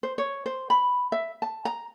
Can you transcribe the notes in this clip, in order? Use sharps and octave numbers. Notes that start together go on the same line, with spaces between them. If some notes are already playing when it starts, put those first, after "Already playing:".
C5
C#5
C5
B5
E5
A5
A#5